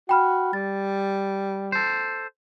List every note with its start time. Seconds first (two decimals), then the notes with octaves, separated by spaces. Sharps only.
0.09 F#4 G5 B5 F6
0.53 G3 A6
1.72 A4 C5